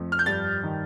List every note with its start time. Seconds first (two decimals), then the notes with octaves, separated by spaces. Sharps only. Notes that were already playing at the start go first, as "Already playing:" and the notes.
Already playing: F2 A3
0.12 F6
0.19 G6
0.26 G2 A6
0.64 D#3